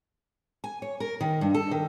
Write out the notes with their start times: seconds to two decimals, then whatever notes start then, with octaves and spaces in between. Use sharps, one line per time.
0.64 G#5
0.82 C#5
1.00 A#4
1.21 D#3
1.41 G2
1.54 A4
1.71 D#3